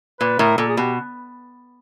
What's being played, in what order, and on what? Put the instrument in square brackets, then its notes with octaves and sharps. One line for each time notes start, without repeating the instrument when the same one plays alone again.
[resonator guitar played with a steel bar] A#2 [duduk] B4
[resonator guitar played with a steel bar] A2 [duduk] A#4
[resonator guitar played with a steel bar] A#2 [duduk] A4
[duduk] G#4
[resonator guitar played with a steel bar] B2 [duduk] G4